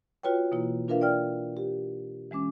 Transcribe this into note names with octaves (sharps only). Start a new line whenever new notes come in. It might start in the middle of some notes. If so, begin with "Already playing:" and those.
F4 F#4 B4 C#5 G5
B2 E3 A#3 E4
D4 F4 A#4 B4 E5 F5
D5 G5 F6
G4
E3 G#3 C#4 D6